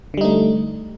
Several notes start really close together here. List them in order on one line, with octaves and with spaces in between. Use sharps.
D3 G3 D#4 A3